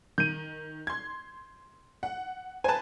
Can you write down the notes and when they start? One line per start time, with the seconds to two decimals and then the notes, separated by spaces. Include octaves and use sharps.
0.18 D#3 G6 D#7
0.87 C6 G#6
2.03 F#5
2.64 B4 C5 G#5 A5